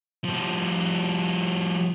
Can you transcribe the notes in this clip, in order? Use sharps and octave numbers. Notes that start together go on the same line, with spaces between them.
F3 G3